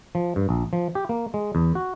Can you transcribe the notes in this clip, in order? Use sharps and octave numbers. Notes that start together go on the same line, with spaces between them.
F3
G2
A#1
F3
G4
A#3
G#3
E2
F#4